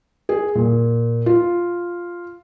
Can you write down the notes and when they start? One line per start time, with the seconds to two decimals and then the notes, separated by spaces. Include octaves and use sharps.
0.29 G#4
0.55 A#2
1.26 F4